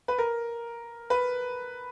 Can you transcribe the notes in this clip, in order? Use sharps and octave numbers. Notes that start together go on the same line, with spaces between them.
B4
A#4
B4